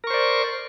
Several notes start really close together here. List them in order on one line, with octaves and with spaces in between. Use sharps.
A#4 C#6 C5 D5